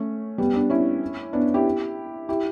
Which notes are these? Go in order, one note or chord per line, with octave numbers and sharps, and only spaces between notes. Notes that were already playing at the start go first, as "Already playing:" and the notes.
Already playing: A3 C#4
G3 B3
B3 D4
C#4 E4
B3 D4
E4 G4
E4 G4